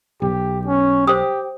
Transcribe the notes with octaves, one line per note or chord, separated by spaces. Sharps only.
B1 G4
C#4
G4 C5 D#6